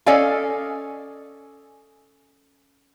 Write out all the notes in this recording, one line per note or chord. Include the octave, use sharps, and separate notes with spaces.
C#4 A4 D5 D#5 F5 G#5